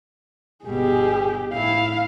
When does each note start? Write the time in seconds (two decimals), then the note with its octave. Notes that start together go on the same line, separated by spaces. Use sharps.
0.65 G1 B2 G4 G#4
1.53 A2 E4 F5